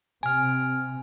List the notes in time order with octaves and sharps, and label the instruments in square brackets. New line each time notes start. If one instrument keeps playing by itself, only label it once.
[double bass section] C3 [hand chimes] G#5 F6